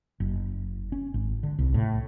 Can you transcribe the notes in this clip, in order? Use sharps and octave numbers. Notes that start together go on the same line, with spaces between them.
F#1
C#4
G#1
D3
C2
A2